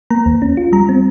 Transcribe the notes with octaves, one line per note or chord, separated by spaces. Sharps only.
A#3 A#5
D#2
C#4
F4
G3 A#5
C4